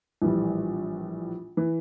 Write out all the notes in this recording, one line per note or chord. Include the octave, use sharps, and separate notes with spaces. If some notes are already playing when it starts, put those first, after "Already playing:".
A#1 A2 E3 G3
E3